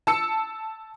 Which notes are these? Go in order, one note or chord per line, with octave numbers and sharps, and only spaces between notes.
A5 E6 C#7